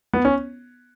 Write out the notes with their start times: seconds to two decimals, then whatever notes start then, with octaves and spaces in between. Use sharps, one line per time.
0.13 B3
0.25 C#4